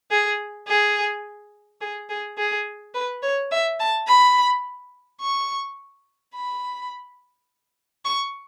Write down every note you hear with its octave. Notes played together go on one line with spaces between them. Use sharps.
G#4
G#4
G#4
G#4
G#4
B4
C#5
E5
A5
B5
C#6
B5
C#6